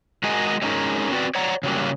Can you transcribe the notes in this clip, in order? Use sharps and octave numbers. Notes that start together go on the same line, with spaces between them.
G#3 F#4 G#4 A#4 D#5
F#3 G#3 C#4 D#4 G#4 A#4
C4 F#4 B4 D5
C#5 D5 F#5 A#5
C#3 F#3 G3 A#3